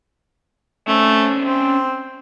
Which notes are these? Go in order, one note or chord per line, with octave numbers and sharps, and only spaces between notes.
A3 C#4 D4 C5
C4